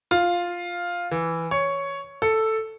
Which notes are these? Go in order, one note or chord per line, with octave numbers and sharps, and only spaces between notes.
F4
E3
C#5
A4